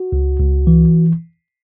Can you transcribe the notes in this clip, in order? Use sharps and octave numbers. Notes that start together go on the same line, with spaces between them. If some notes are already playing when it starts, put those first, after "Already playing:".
Already playing: F#4
C#2
C#2
E3